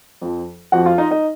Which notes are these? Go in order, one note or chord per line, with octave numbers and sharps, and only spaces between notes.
F2 F3
F2 F3 F#4 F#5
F4 F5
D#4 D#5
D#4 D#5